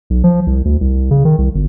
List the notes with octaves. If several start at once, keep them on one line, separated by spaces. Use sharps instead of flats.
B1
F3
C2
D2
C2
C#3
D#3
C2
G1